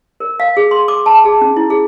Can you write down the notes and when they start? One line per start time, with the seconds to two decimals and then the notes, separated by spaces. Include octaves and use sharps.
0.20 A#4
0.40 F5
0.57 G#4
0.71 C6
0.88 D6
1.06 A5
1.25 G#4
1.41 C#4
1.56 E4
1.70 G#4